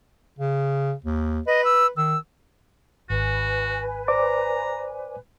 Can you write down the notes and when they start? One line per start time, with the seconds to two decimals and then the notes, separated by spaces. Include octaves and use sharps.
0.39 C#3
1.05 D#2
1.47 B4 D#5
1.65 E6
1.97 D#3 E6
3.10 G#1 F#4 B4 G#5
4.08 C5 D5 A#5 D6